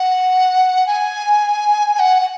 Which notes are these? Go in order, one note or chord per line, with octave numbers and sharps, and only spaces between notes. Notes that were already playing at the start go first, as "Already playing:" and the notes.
Already playing: F#5
G#5
G#5
F#5
F#5